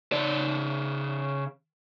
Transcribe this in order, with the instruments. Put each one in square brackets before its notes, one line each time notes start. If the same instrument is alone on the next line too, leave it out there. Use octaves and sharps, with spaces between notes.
[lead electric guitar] C#3 D5